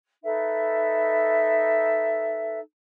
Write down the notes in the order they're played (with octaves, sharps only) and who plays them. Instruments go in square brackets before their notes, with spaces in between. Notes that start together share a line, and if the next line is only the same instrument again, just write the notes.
[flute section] D#4 A4 B4 E5